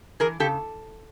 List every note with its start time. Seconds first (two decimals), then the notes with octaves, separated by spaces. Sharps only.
0.20 E3 G#4 A#4
0.40 C#3 G4 A4